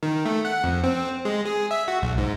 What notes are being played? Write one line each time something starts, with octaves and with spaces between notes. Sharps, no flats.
D#3
A3
F#5
F2
C4
G#3
G#4
E5
F#4
B1
G#2